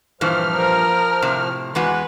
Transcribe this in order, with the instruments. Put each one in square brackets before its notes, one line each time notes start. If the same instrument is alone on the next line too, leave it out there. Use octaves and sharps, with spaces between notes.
[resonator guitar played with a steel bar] G2 A#2 E3 [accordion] F3 F6
[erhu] A#4
[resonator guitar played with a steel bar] A2 C3
[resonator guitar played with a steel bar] E2 G#3 F#4 [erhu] B4